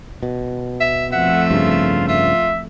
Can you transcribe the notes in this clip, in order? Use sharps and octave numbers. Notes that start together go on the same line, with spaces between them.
B2
E5
F2 A3 E5 F#5
G2 C#3 F4
F4 E5